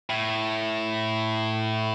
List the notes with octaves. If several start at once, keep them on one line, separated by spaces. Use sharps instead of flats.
A2